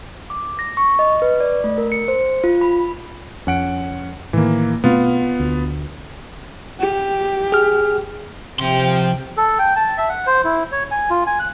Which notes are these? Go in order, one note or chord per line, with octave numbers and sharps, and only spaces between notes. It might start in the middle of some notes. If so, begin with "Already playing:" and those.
D6
A#6
C#6
D#5
B4
D5
A3
A#4
C#7
C5
F4
B5
F2 C#4 F#5 D7
A2 D#3 E3 A#3
B2 A3 B3 C4 F4
D2
G4
G#4 F6
C3 F3 G5 C6
A4
G5
A5
E5
F#5
C5
E4
C#5
G#5
F4
G#5
F#6